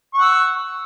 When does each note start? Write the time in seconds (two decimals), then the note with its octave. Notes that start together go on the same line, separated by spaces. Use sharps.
0.14 C#6
0.18 F#5
0.22 E6